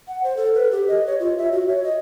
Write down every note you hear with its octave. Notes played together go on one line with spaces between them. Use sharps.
F#5
C5
A4
B4
G4
D#5
C#5
F4
E5
F#4
C#5
D#5